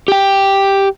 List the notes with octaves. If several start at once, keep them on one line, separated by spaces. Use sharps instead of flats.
G4 G5